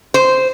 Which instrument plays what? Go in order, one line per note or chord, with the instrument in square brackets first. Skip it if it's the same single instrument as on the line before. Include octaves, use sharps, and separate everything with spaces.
[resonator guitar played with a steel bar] C5